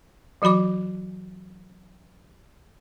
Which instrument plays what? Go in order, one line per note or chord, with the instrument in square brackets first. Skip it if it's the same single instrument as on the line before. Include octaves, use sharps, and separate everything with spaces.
[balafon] E3 F#3 F#4 B5 D6